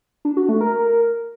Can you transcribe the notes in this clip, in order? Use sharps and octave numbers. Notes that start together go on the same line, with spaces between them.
D4
F#4
A3
A#4